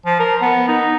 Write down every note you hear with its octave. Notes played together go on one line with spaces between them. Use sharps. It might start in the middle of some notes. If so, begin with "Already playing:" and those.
F3
A#4
B3
D#4